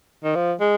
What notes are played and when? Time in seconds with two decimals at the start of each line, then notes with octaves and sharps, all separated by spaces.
0.24 D#3
0.35 F3
0.60 G#3